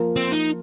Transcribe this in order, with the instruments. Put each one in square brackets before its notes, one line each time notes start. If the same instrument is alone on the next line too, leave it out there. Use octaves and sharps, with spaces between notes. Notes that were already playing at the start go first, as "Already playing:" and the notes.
Already playing: [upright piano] F3 A#3 F4 A#4
[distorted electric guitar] C4
D#4